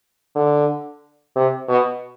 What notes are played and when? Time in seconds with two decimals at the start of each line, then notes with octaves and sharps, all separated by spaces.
0.36 D3
1.36 C3
1.69 B2